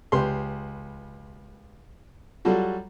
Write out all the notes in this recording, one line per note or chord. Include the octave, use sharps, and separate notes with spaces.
C#2 G4 B4 C6
F#3 G3 F4 F#4 A4